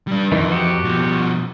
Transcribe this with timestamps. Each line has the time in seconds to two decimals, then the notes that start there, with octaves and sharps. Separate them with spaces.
0.08 G3 D4
0.32 F2 D#3 E3
0.52 F#4 G4
0.84 B2 F3